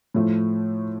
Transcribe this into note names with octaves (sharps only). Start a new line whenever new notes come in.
A2 F3 A3